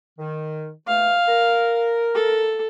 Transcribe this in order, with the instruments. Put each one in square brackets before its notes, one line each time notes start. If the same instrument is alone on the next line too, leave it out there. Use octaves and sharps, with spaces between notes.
[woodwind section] D#3
[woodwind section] E2 A3 [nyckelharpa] F5
[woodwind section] A#4
[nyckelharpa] A4